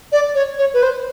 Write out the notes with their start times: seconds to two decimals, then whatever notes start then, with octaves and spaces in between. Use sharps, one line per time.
0.12 D5
0.35 C#5
0.58 C#5
0.74 B4
0.83 C5